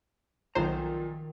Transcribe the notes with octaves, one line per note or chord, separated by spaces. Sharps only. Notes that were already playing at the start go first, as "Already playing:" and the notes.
B1 A#2 D#3 F3 C5 A#5